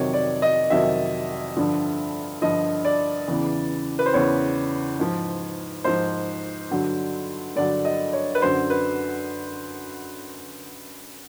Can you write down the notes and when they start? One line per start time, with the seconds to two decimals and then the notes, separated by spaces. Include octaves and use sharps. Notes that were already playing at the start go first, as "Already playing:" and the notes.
Already playing: F2 C3 D#3 F#3 C#5
0.14 D5
0.42 D#5
0.70 F2 C3 D#3 F#3 E5
1.57 G2 D3 F3
2.42 G2 D3 F3 D#5
2.85 D5
3.28 E2 C#3 E3
3.99 B4
4.06 C5
4.13 E2 C#3 E3 C#5
4.99 G#2 F3
5.84 G#2 F3 C5
6.71 G2 D3 F#3
7.56 G2 D3 F#3 D5
7.85 D#5
8.13 C#5
8.35 B4
8.42 F#2 D3 F#3 C5
8.70 B4